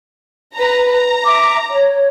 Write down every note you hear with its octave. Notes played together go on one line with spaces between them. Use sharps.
B4 A#5
A#5
E5 D6
C#5